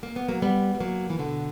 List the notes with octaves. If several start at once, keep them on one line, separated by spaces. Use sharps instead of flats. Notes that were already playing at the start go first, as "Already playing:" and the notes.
A#3
B3
F#3 A#3
G3 B3
G3
F#3 A#3
E3
B2 D3